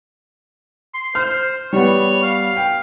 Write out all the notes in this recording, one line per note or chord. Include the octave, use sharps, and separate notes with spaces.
C6
C5 F6
G3 B3 C#5
F5
G5